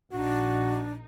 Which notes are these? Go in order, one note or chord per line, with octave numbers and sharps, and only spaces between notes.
A#1 D4 D#4 F#4